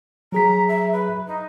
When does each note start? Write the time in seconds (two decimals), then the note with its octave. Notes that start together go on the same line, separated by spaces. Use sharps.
0.32 F#3 G#4 A#5 B6
0.68 E5
0.92 B4
1.27 D#4